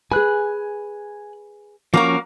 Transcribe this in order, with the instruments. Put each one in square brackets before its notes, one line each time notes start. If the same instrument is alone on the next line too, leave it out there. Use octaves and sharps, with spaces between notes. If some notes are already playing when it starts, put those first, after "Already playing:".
[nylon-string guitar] G#4 B4 [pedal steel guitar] G#5 F#6
[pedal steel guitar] F3 C#4 C#6 [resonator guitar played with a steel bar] A#3 F#4 A#4